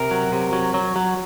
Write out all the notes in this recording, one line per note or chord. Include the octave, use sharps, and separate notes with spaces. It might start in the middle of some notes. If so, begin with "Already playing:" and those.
Already playing: C3 A#4
F#3
C3
F#3
F#3
F#3